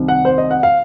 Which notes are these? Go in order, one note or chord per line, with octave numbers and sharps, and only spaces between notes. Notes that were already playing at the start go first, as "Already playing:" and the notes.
Already playing: C2 C3 D#3
F#5
C5
D#5
F#5
F5